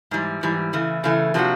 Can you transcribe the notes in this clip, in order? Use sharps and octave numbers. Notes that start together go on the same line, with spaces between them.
G#2 E3 G3
G#2 E3 G3
C#3 E3 A3
C#3 E3 A3
C3 F3 A#3 D4 F#4